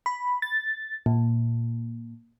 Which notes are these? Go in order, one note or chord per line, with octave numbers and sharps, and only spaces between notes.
B5
A6
A#2